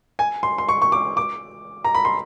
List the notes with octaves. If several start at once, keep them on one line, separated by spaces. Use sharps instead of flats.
G#5
C6
C6
C#6
C#6
D6
D6
A#5
B5
C6